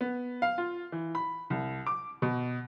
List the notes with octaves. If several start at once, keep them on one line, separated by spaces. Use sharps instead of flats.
B3
F5
F4
E3
B5
C2
D6
B2